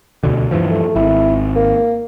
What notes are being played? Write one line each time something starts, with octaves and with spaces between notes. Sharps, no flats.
D2 B2 D3
G2 E3 F3
A3
G#1 E4
A#3